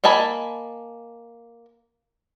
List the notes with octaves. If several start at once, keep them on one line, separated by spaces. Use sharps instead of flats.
A#3 D#5 G#5 A5 B5